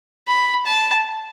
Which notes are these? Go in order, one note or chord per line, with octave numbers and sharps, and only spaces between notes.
B5
A5